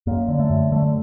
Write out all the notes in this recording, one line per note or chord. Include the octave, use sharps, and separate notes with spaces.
F#2 A#3
D3
A3
F#2
D3 A3